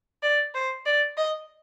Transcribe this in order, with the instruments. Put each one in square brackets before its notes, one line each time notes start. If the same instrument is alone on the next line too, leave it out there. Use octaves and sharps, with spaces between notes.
[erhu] D5
C5
D5
D#5